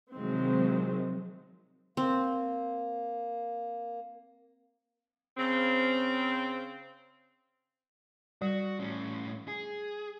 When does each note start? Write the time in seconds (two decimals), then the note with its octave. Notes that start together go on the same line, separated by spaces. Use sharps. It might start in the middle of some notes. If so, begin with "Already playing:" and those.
0.14 C3 D#3 F3 F#3 G#3 C4
1.97 A#3 C4
5.37 C#3 C4
8.42 G3 F#4
8.80 A2 C#4
9.48 G#4